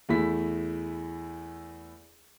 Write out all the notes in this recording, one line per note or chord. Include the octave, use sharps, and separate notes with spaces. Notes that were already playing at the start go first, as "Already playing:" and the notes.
E2 A3 E4 B6